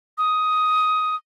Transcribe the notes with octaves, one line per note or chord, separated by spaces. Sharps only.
D#6